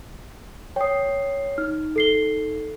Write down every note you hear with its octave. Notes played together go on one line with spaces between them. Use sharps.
C#5 G5 D#6 C7
D#4 F6
A4 C7 G7